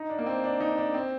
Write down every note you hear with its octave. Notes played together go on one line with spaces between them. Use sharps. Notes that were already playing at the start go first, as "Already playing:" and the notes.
Already playing: D#4
D4
A#3
C4
D4
D#4
D4
C4